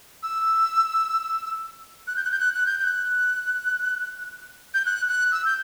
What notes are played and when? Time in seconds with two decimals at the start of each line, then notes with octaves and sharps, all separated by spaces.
0.23 E6
2.07 F#6
2.17 G6
2.25 F#6
2.31 G6
2.40 F#6
2.54 F#6
2.66 G6
2.79 G6
2.84 F#6
4.74 G6
4.86 F#6
5.08 F#6
5.32 E6
5.45 G6